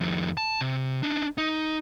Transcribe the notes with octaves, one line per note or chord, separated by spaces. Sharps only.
F2 D#3
A5
C3
D4 D#4
D#4